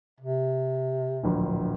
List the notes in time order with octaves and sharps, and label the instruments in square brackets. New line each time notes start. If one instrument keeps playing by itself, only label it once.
[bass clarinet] C3
[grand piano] D1 A#1